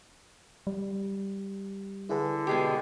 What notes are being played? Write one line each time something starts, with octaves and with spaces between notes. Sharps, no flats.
G3
D3 E4 G#4 B4
B2 G#3 G4